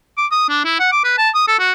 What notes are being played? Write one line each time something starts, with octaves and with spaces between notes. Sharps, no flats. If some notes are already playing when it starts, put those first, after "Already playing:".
D6
D#6
D4
E4
F#5
D6
B4
A5
D#6
A4
F#4